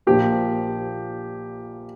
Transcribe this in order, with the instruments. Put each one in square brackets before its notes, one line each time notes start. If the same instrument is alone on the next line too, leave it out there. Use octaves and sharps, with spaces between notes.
[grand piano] A#1 A#2 F3 A#3 G4